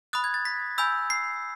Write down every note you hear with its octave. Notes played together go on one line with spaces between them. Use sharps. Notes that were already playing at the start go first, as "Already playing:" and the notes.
B5 D#6 F#6 A6
G#6
A6
B6
G#5 B5 E6 G6
C7